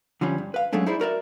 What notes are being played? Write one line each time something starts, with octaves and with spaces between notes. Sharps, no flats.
D3 F3 G3 C#4
G2
B4 F5
F#3 G#3 A3 C#4 D4
D#4 E4 G#4 C5 D5
F#4 A#4 D5 E5